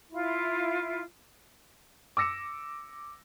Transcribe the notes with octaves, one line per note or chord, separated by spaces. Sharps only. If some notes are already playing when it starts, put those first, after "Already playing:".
E4 F4
D6 E6 A#6 C#7 E7